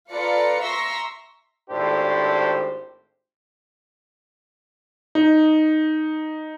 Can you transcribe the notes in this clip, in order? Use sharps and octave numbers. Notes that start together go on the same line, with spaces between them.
F4 A4 B4 D5 A#5 C#7
E5 A#5 C6 C#6 E6 A#6
G#1 A2 D4 G4 C5
D#4